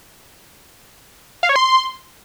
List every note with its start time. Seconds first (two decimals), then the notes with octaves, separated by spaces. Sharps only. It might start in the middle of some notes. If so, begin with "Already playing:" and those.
1.43 F5
1.49 C#5
1.56 C6